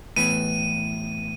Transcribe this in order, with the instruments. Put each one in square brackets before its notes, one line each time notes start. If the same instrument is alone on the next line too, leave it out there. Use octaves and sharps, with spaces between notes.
[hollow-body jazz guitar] A2 E3 B3 [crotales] D#7